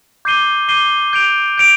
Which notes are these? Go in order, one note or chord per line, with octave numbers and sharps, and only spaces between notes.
D6 G6 C7 D#7 G7
D6 G6 C7 D#7 G7
G6 D7 F7
G6 D7 F7